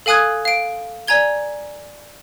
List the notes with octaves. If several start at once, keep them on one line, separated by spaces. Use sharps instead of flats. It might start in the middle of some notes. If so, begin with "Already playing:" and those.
A4 F5 G#5 D#6 F#6 G#6
F5 D7
D5 G#5 A#5 G#6 G7